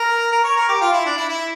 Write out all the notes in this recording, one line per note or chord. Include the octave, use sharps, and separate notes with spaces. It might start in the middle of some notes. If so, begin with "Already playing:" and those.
Already playing: A#4
A#4
C#5
A#4
G4
F4
E4
D4
E4
E4